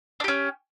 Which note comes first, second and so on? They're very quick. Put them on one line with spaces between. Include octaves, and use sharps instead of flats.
D4 G4 C#4